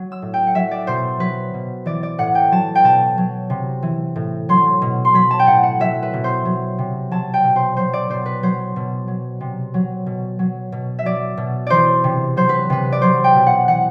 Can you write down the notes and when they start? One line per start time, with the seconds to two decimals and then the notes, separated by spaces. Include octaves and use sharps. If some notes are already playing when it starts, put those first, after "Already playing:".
Already playing: F#3
0.12 E6
0.22 A2
0.34 G5
0.47 F#5
0.55 F#3 E5
0.71 D5
0.87 B2 C5
1.20 F#3 B4
1.54 B2
1.86 E3 D5
2.03 D5
2.18 A2 F#5
2.35 G5
2.51 F#3 A5
2.75 G5
2.84 B2 A5
3.18 F#3
3.50 C3
3.83 E3
4.16 A2
4.49 F#3 C6
4.82 B2
5.05 C6
5.14 F#3 B5
5.31 A5
5.39 G5
5.46 A2 F#5
5.63 F#5
5.80 F#3 E5
6.03 B4
6.13 B2
6.24 C5
6.45 F#3
6.78 C3
7.11 F#3 A5
7.34 G5
7.44 B2
7.56 C5
7.77 F#3 C5
7.93 D5
8.10 B2 C5
8.26 B4
8.43 F#3 C5
8.76 B2
9.08 F#3
9.41 C3
9.74 F#3
10.06 B2
10.39 F#3
10.72 B2
10.99 E5
11.05 F#3 D5
11.37 B2
11.67 E3 C5 D5
12.04 C3
12.37 F#3 C5
12.49 B4
12.70 C3 B4
12.92 D5
13.02 F#3 C5
13.24 G5
13.35 B2
13.46 F#5
13.68 E3 F#5